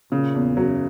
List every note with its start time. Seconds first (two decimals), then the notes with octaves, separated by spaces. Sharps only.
0.11 A#2 C#3
0.35 E2
0.57 F#2 F#3